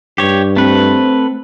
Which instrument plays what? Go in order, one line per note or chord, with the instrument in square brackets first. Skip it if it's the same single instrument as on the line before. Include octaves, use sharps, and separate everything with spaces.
[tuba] G2 [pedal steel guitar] G4 C#5
[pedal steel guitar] A3 B4 [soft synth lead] C4